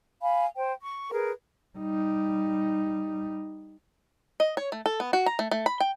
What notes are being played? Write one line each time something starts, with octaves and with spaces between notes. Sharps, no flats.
F5 G#5 B5
C5 G5
C#6
G#4 A#4 B4
G3 D#4
D#5
C#5
A3
A4
B3
F#4
A#5
A3
A3
B5
G5